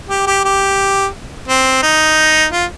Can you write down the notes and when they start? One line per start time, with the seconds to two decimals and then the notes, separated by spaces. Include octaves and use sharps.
0.09 G4
0.27 G4
0.44 G4
1.48 C4
1.83 D#4
2.52 F4